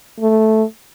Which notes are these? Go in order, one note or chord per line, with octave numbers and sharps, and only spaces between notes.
A3